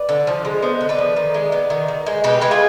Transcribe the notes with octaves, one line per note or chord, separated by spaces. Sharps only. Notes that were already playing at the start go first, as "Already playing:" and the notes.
Already playing: B4 D5
D3
F3
G#3
B3 C5 D#5
D3
B4 D5
F3
D#3
G#3
B3
D#3
D#3
G#3
B2 G4 B4
G#3 B4
F4 G#4